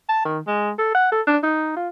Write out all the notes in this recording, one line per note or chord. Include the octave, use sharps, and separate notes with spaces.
A5
D#3
G#3
A4
F#5
A4
D4
D#4
F4